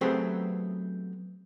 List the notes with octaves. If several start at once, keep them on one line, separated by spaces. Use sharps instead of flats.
F#3 A3 B3 C4 G4 G#4